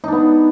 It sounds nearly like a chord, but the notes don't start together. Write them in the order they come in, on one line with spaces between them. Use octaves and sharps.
D#4 D4 B3